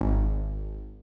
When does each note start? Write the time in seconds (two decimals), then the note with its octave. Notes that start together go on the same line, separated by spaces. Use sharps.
0.01 G#1